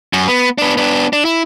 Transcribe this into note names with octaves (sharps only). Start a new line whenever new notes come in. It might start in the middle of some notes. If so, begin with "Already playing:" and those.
F#2
B3
B3 D4
B3 D4
D4
E4